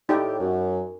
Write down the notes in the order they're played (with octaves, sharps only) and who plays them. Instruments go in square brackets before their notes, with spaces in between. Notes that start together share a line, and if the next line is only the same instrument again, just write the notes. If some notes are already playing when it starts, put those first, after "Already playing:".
[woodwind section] A2 G4 [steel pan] D#4 D5 G5
[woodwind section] F#2